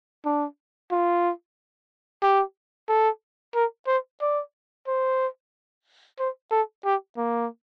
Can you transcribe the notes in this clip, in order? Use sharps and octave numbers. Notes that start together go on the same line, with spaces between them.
D4
F4
G4
A4
A#4
C5
D5
C5
C5
A4
G4
A#3